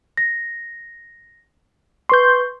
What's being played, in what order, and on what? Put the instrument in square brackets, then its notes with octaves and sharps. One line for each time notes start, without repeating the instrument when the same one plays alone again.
[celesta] A#6
[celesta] B4 C#6 [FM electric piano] C6 G6